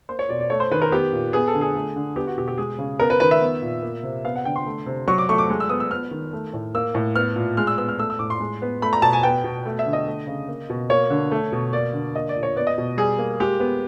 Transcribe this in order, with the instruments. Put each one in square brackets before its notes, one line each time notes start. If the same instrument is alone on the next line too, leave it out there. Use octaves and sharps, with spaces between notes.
[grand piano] A#3 C5
C#5
B2 D5
D5
A3 C#5
C5
D#3 B4
A#4
B3 G4
A#2
B3 G#4
A4
D3
G#4
A3
D3
B3 G4
F#4
B2 G4
G4
G#3 G#4
C#3
B3 A#4
B4
D#3 B4
E5
B3
A#2
A#3
C3
B3 F5
F#5
D3 G5
C6
A3
C3
F#3 C#6
D6
A3 C#6
D6
G#3
E6
B3 D#6
E6
B3 F6
D#3
A3
A2
A#3 E6
A2
B3 F6
A#2
G#3 F6
E6
B3 E6
F6
A3 E6
E6
A2 D6
C6
G#3
B3
A3 B5
A#5
B2 A5
G#5
B3 G5
B2
A3
E5
D3
D#5
A3
C#3
A#3
B2
A#3 C#5
D3
A3
B2
A#3 D5
D3
A#3 D#5
D5
A#2
C#5
B3 D5
D#5
B2
G3 G#4
A#3
G#3 G4
B3